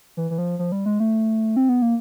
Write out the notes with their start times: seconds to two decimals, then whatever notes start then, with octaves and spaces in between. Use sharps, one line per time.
0.17 E3
0.31 E3
0.38 F3
0.59 F3
0.72 G3
0.86 G#3
1.00 A3
1.56 C4
1.69 B3
1.82 A#3